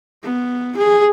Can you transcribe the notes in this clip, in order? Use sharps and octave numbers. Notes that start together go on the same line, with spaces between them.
B3
G#4